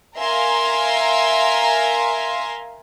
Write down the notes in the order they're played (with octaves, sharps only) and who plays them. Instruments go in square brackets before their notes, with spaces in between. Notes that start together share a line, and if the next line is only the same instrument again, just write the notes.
[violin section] A#4 E5 F5 G#5 A#5 C6